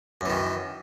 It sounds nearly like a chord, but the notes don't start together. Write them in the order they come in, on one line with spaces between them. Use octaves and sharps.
F#2 E3 D#3